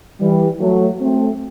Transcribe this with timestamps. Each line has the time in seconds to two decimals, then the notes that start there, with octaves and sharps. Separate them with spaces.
0.20 E3 G3
0.60 F#3 A3
1.01 A3 C4